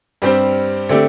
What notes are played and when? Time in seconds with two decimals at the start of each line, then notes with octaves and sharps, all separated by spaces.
0.22 G2 G3 C4 G4 C5
0.89 D3 A3 C4 G4 D5